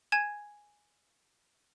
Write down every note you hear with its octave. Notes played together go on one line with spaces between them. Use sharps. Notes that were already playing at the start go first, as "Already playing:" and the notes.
G#5 G#6 E7